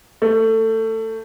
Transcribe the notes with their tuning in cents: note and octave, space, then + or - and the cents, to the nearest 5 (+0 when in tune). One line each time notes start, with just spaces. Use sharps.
A3 +20